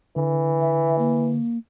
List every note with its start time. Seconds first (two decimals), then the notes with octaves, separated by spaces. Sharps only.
0.16 D3 E3
0.61 E5
0.99 A#3